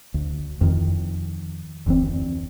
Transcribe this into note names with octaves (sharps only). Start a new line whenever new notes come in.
D2
F2 D#3
F1 D2 E3 C4